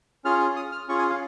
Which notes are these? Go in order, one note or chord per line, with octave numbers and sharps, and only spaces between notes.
C#4 F4 G#4 F6
D#6
F6
C#4 F4 G#4 C#6
G#5
F5